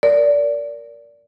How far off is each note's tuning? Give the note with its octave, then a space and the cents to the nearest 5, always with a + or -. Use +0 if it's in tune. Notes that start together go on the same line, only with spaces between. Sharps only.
A#4 +0 D5 -20